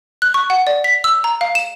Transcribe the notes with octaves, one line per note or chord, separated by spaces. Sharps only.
F#6
C#6
F#5
D5
B6
E6
A#5
F5
E7